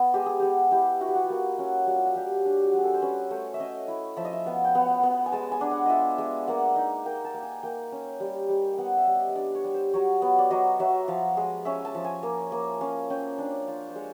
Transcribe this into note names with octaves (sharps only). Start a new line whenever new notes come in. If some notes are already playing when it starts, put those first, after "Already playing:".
Already playing: B3
G#3 G4
G#4
B3 G4
E4 G4
E4 F#4
G4
F#4
F4
A#3 F#4
C#4 F#4
G3 F#4
F4
F#4
G3 G4
D4
F#4
G3
G#4
A4
C5
C#4 B4
A3 C5
E5
C#4 D#5
E4
F3 E5
D#5
E5
B3 F5
G5
B3 F#5
B3
G#5
G#3 A5
G#5
D4
F#5
F4 D#5 E5
G#3
A#3 F#5
D#4
A#3 G5
A5
A#3
G#5
A#3 G5
C#4
G3
G3
B3 F#5 G5
E5
G3
D#5
D#5
D4 D5
C#5
G3
C5
F#3 C#5
B3
D5
F#3 D#5
F#3 E5
F3 F5
G#3
C#4 E5
A5
F3
G#5
A#3
A#3
C#4 F5
C#4 G5
D4 D5
F4
C5
G#3 C#5